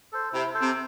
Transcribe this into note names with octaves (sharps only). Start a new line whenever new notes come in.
A4 C5
C3 E4
A4 C5
C3